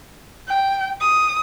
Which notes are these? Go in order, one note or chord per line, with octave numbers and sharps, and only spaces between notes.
G5
D#6